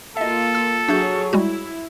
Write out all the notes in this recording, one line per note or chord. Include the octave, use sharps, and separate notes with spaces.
A#3 F4 A4 D#5 E5
E6
F#3 D4 G#4 C#5 E5 G6
G3 G#3 E4 F#4